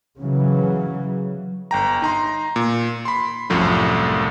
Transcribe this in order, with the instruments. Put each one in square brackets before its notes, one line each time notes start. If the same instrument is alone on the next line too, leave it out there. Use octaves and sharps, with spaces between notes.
[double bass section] C#3 E3 F#3
[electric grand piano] G1 G5 A#5
D#4 A#5 C6
A#2
B5 C6
C2 F#2 A2 F3 A3